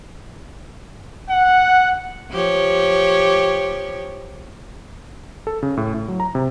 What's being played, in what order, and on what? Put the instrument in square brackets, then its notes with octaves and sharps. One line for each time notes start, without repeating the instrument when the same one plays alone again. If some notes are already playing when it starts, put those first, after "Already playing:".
[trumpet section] F#5
[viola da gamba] F3 G4 C#5
[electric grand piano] A4
C#3
A2
A2
F#3
A#5
C3